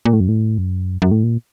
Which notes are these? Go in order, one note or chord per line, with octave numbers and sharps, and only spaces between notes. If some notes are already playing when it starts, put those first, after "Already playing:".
A#2
A2
F#2
A2
F#2
F#2
A2
A#2